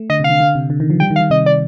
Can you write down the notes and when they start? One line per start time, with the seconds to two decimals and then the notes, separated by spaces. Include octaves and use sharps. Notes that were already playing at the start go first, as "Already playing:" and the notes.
Already playing: A3
0.10 D3 D#5
0.20 C3 F5
0.30 D3
0.40 D3
0.55 C3
0.70 D3
0.80 D#3
0.90 F3
1.00 G3 G5
1.11 D#3
1.16 F5
1.21 D#3
1.30 C3 D#5
1.46 D5